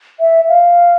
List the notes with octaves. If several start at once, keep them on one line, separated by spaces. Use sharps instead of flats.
E5
F5